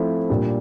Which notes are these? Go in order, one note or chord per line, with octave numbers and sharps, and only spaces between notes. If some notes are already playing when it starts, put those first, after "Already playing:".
Already playing: F3 A3 C4 E4
A#2 G3 D4